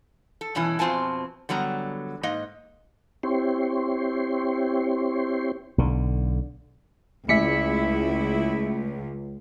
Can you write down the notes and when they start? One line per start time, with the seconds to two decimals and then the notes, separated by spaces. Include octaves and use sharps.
0.41 A4
0.55 G2 B2 E3 C#4 E4
0.79 F2 B2 C4 F4 G#5 A5
1.49 D3 F#3 G3 B3 A#5
2.23 G#2 A#3 D#5
3.23 C4 E4 G4 C#5 C6
5.78 B1 D3
7.29 C#2 A3 E4 E5 B6 C#7